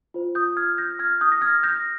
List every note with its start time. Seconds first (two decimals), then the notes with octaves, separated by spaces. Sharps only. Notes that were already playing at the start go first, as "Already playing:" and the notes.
0.14 F4 C5
0.35 D#6 G6
0.57 F6 G#6
0.78 G6 A#6
0.99 F6 G#6
1.21 D#6 G6
1.32 A#6
1.41 F6 G#6
1.63 G6 A#6